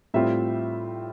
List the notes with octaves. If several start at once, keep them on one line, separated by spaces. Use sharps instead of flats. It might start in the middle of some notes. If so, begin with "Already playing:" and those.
A2 G3 C4 F4 E5